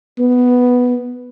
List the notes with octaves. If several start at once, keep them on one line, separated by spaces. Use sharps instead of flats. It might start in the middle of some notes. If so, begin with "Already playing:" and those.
B3